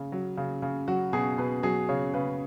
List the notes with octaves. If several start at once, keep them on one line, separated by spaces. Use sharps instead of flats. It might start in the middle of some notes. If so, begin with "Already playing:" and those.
Already playing: C#3
F#3
C#3
C#3
F#3 F#4
B2 G#4
B2 B4
F#3 G#4
C#3 C#5
C#3 B4